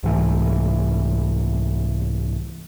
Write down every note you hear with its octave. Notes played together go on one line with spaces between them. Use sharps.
C2 G#2 E3 A3